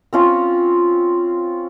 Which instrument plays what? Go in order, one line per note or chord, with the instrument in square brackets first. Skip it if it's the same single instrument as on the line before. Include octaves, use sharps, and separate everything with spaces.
[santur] C4 C#4 F4